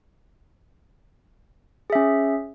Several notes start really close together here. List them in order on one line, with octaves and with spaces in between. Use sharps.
G#4 E5 C#4